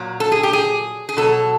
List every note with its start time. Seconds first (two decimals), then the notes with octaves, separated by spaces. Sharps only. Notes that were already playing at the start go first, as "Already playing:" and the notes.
Already playing: A#2 F#3
0.20 A4
0.32 G#4
0.43 G4
0.53 G#4
1.09 G#4
1.17 B2 F#3 A4